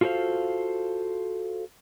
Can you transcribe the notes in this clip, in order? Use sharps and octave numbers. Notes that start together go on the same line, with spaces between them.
F4 F#4 A4 A#4 C5 F5